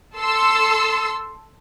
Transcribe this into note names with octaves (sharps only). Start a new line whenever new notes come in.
A4 C6 E6